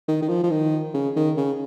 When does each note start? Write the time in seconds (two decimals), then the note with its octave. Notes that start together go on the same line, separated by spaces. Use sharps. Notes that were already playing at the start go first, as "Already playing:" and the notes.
0.09 D#3
0.22 D#3
0.29 F3
0.44 F3
0.51 D#3
0.94 C#3
1.16 D#3
1.37 C#3